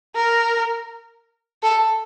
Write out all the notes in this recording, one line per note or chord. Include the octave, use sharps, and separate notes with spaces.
A#4
A4